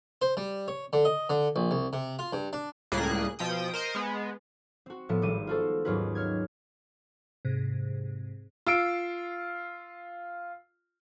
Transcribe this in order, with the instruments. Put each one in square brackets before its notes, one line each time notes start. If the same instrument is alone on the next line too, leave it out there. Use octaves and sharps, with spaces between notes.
[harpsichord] C5
G3
C#5
D3
D#5
D3
A#1
C2
C3
F4
G2
D4
[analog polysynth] C#2 A2 G3 A#3 G#4 F#6
B2 F3 G5 D#6
A#4 C5 D#5
G#3 B3
[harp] C4 F#4
A2 F3 B3 E5 C#7
G#1 G3 G4 D#7
F4 F#4 A4 C5
D#2 G#2 F#3 C#4 F4 B4
C#5 F6 G#6
[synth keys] G#2 C3
[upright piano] F4 E6 D7